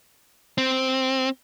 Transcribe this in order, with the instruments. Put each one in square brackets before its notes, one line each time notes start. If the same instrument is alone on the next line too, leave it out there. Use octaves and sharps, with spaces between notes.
[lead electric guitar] C4